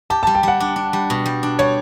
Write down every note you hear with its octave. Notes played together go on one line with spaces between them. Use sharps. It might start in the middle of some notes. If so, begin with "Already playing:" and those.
G4 A5
G3 A5
G5
G3 F#5
D4
D4
G3
B2
G3
D4
G3 C#5